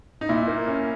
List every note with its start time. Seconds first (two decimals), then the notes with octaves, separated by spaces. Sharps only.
0.21 D#4
0.29 A#2 E4
0.48 A#3
0.67 C#4